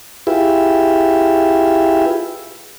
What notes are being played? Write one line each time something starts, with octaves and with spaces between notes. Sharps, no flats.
E4 F4 G4 G#4 B4 E5